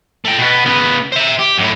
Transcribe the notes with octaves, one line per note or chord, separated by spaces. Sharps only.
A3 G5
B2 B3
C#3 B3
C5 E5
G4
F#2 A2